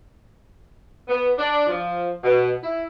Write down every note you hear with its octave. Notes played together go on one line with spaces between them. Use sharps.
B3
D4
F3
B2
E4